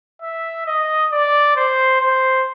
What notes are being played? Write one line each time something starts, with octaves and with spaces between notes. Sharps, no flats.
E5
D#5
D5
C5
C5